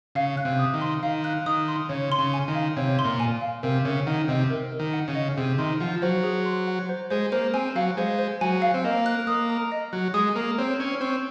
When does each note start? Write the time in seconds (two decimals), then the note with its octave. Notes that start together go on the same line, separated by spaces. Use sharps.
0.15 C#3 F5
0.37 F#6
0.45 C3
0.59 D#6
0.74 D#3
0.81 C6
1.03 D#3 F5
1.24 F#6
1.46 D#3 D#6
1.68 C6
1.89 C#3 C#5
2.12 C6
2.18 C#3
2.34 G#5
2.48 D#3
2.55 F5
2.77 C3 C#5
2.99 C6
3.05 A#2
3.20 G#5
3.41 F5
3.63 C3 A#4
3.85 C#3 A#4
4.07 D#3 F#5
4.28 C3 D#5
4.50 A#4
4.72 A#4
4.79 D#3
4.93 F#5
5.08 C#3
5.15 D#5
5.37 C3 G#4
5.58 D#3 C6
5.80 F3 F#5
6.02 F#3 C5
6.23 G#4
6.45 C6
6.68 F#5
6.89 C5
7.10 G#3 C5
7.32 A#3 C5
7.54 C4 G#5
7.75 F#3 F5
7.97 G#3 C5
8.19 C5
8.41 F#3 G#5
8.62 F5
8.74 C4
8.84 A#3 D#5
9.06 F#6
9.27 A#3 D#6
9.50 A#5
9.72 D#5
9.93 F#3 F#6
10.14 G#3 D#6
10.36 A#3 A#5
10.58 C4 C#5
10.79 C#4 C#5
11.01 C4 C#6